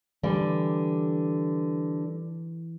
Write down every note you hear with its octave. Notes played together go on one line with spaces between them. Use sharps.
D3 E3 G3